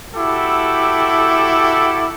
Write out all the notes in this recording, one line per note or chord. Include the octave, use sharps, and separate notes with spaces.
E4 F#4 G4 A4 D6